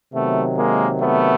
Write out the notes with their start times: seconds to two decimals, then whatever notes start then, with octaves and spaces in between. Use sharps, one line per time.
0.14 C3 D#3 F#3 A3 B3
0.57 G#3 A#3
1.01 A3 B3